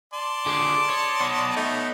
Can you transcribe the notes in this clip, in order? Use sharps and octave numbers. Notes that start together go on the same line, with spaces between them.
D5 A5 C6
D3 G#3 D6
C#5 D#5
B3 C#5
A3 D#4